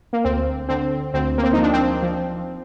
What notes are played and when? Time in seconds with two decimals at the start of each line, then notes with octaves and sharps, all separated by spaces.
0.13 A#3
0.24 D2 C4
0.69 D3 C4
1.14 D2 C4
1.38 A#3
1.43 C4
1.53 D#4
1.58 F3 D4
1.73 C4
2.03 F3